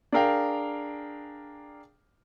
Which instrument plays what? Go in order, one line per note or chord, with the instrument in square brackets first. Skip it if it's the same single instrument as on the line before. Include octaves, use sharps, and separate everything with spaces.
[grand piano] D4 G#4 A#4 F5 G5